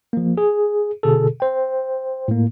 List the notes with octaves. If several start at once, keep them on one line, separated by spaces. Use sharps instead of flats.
F3 A#3
G#4
B2 D3 G#4 A4
C5 G5
A2 A#3